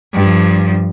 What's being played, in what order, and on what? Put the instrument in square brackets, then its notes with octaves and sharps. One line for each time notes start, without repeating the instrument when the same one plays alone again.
[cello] G2 F3